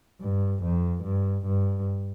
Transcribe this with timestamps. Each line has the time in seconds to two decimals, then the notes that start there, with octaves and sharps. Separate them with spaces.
0.21 G2
0.63 F2
1.04 G2
1.46 G2